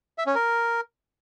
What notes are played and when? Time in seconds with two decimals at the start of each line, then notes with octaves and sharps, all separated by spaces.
0.18 E5
0.27 C#4
0.35 A#4